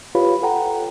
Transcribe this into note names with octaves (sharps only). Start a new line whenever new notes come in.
F4 G4 B4 C#5 F5 B5
A4 F#5 G5 A#5